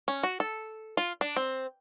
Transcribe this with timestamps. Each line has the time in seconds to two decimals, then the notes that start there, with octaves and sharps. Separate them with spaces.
0.08 C#4
0.23 F#4
0.40 A4
0.97 F4
1.21 D4
1.36 C4